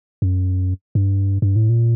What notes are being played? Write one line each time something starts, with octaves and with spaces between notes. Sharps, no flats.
F#2
G2
G2
A2
A#2